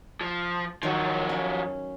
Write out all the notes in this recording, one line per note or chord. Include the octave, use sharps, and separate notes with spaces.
F3
D#3 F3 F#3 F#4
C#4